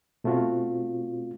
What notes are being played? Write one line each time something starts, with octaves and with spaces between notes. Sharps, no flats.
B2 A3 C4 F4 F#4